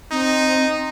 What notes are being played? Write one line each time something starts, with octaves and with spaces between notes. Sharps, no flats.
C4 D#4